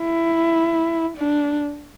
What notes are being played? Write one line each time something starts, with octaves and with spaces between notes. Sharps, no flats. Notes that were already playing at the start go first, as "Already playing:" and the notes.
Already playing: E4
D4